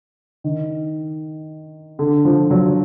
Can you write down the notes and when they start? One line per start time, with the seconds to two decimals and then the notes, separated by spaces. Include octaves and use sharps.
0.44 D#3
1.99 D3
2.25 F3
2.51 F#3